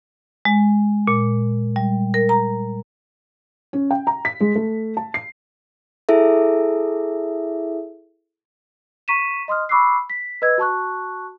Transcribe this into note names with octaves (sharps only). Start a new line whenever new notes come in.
G#3
A#2
G3
A#4
A#5
C#4
G5
A#5
B6
G#3
A3
A5
C7
E4 G#4 A4 E5
A#5 C#6 B6 D#7 E7
D#5 C6 D#6 F6
B5 C#6 D6 E6 F#6 C7
B6
B4 D#5 E6 G#6
F#4 A5 C#6 F#6